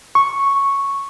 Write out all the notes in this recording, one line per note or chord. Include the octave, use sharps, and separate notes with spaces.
C#6